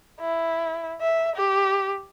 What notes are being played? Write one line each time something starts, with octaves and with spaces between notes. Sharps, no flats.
E4
E5
G4